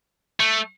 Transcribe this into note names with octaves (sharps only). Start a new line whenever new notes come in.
A3